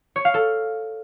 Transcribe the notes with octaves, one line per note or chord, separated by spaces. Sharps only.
C#5
F5
A4